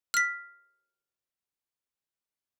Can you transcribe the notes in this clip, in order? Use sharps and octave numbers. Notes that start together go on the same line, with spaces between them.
F6 B6